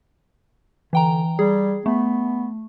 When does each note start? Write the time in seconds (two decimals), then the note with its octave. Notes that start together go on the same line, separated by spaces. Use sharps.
0.93 D3 E3 G5 A#5
1.39 G3 G#4
1.86 A3 B3